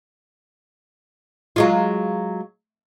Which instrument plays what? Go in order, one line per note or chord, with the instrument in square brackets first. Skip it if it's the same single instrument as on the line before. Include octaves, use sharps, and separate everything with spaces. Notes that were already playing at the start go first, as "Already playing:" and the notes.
[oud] F#3 G#3 F4